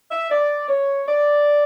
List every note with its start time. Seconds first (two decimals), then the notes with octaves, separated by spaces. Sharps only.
0.11 E5
0.30 D5
0.69 C#5
1.08 D5